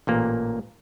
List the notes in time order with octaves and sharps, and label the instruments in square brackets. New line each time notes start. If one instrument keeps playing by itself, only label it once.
[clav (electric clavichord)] A1 A#2 A#3